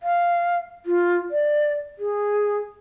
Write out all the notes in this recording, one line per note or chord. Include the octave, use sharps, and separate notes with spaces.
F5
F4
D5
G#4